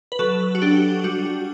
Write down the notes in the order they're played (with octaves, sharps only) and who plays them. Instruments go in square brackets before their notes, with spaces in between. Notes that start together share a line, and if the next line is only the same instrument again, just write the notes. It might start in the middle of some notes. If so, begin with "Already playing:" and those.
[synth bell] B4
F#3 A4
F#4
D4 G4
G3 F#4
F#4